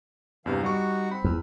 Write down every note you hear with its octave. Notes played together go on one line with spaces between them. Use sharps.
E2 G2 C3 E3 F5
G3 D#4 F#4 F#5 C#6
C4 B5
E2